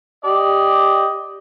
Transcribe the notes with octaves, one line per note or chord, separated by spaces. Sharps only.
G4 D5 D#5